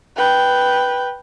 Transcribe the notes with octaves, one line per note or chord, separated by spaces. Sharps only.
B4 G5